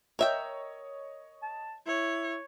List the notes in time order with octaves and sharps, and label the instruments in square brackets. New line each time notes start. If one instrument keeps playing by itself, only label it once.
[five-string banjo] A#4 E5 G5 [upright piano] C#5 D#5
[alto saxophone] A5
[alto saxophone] E4 [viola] C#5